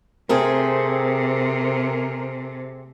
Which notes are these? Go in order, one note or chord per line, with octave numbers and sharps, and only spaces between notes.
C3 A3 C4 G#4 A#4